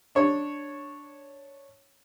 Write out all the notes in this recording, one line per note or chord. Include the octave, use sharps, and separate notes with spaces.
D4 C#5